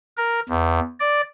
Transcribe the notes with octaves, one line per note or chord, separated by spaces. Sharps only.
A#4
E2
D5